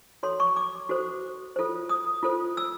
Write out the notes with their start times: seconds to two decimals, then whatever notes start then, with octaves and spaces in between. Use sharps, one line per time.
0.23 F#4 A4 C#5 C6
0.40 C#6
0.56 D6
0.89 F#4 A4 C5
1.56 F4 A4 C5
1.89 D#6
2.23 F4 A4 C5
2.57 E6